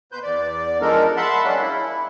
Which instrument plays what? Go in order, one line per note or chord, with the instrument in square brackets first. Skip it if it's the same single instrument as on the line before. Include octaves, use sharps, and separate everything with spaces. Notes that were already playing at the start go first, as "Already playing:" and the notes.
[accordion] B2 B4 C5 G6
E2 D5
F3 G#3 D4 D#4 A4 A#4
E5 F#5 A5 B5 C6
F#3 G#3 A#3 C#4 D4
E4